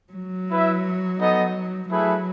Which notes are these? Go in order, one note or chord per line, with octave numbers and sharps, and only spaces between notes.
F#3
E4 B4 E5
B3 D#4 A4 D#5
F#3 A3 E4 G#4 B4 E5